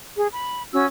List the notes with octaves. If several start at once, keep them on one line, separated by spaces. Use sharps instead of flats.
G#4
B5
C#4 F#4 E6